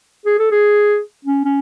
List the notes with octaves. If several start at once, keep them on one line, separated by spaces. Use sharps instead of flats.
G#4
A4
G#4
C#4
C#4